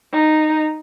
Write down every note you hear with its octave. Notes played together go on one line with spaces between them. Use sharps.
D#4